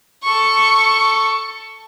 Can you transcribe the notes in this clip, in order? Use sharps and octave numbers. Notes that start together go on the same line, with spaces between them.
A4 C#6